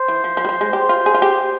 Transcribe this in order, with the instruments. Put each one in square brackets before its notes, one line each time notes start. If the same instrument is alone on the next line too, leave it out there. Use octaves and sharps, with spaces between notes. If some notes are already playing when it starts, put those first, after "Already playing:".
Already playing: [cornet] C5
[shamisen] E3
F3
F3
G3
F3
G#3
[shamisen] G4 [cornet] C5
[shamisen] F4
G#4
F4
G4